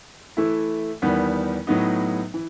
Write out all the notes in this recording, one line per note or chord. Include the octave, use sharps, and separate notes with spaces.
E3 A3 E4
E2 D#3 G3 B3
A2 F#3 B3 D#4
E3